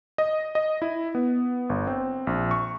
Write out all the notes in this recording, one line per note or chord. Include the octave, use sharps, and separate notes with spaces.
D#5
D#5
E4
B3
G1
C4
A#1
C#6